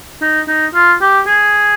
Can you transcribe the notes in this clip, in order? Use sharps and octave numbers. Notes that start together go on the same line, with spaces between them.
D#4
D#4
F4
G4
G#4